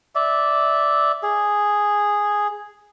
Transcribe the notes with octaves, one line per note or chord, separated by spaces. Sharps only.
D5 E5
G#4